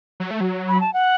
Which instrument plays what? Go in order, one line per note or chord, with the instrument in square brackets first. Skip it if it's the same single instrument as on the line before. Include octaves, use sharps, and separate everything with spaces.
[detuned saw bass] F#3
A3
F#3
[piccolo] B5
A5
F#5